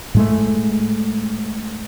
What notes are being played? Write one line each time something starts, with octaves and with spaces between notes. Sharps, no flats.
A2 G#3 A3